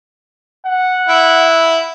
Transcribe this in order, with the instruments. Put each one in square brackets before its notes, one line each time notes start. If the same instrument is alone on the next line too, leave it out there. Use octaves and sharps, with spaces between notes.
[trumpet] F#5
[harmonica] E4